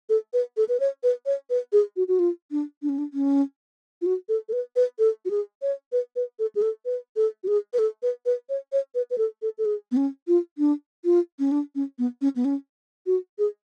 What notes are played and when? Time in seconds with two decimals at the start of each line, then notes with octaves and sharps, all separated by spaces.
0.09 A4
0.33 B4
0.57 A4
0.69 B4
0.80 C#5
1.03 B4
1.26 C#5
1.50 B4
1.73 G#4
1.96 F#4
2.08 F#4
2.19 F4
2.51 D4
2.82 D4
2.89 C#4
2.98 D4
3.13 C#4
4.02 F4
4.06 F#4
4.29 A4
4.49 A4
4.53 B4
4.76 B4
4.99 A4
5.25 F#4
5.30 G#4
5.62 C#5
5.92 B4
6.16 B4
6.39 A4
6.55 G#4
6.62 A4
6.85 B4
7.16 A4
7.43 F#4
7.48 G#4
7.73 B4
7.79 A4
8.03 B4
8.26 B4
8.49 C#5
8.72 C#5
8.95 B4
9.10 B4
9.18 A4
9.42 A4
9.58 A4
9.65 G#4
9.92 B3
9.97 C#4
10.28 F4
10.58 D4
11.05 F4
11.39 C#4
11.51 D4
11.75 C#4
11.99 B3
12.21 C#4
12.36 B3
12.45 C#4
13.06 F#4
13.39 G#4